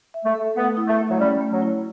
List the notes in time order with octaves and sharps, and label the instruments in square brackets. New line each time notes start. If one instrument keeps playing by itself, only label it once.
[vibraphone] E5
[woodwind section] A3
[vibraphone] A4
[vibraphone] A3 [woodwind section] B3
[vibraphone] E4
[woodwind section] A3
[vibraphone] A3
[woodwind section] F#3
[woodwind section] G3 [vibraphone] C#4
[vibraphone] A3
[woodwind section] F#3
[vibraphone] E4